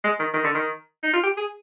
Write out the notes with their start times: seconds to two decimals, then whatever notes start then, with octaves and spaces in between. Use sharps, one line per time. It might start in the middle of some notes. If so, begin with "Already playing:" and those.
0.04 G#3
0.20 D#3
0.34 D#3
0.44 D3
0.54 D#3
1.03 D#4
1.13 F4
1.24 G4
1.37 G#4